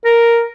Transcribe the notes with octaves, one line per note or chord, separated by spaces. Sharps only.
A#4